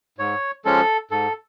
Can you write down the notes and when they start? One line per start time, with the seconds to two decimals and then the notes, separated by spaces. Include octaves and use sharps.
0.18 G#2 C#5
0.65 F3 G#3 C#4 A4
1.11 G#2 A4